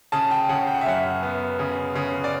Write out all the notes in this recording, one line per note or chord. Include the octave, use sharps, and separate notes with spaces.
C#3 A5
G5
C#3 F#5
G5
F#5
E5
F#2 F#5
B3
C#3
C#3
D5